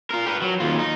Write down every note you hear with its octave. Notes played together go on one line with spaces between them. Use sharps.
F4 A#4
G4 B4
F#3
D#2 F4
D#4